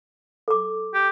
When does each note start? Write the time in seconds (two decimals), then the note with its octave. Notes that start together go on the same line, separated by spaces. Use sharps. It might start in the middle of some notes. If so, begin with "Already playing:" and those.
0.48 A4 D6
0.94 G4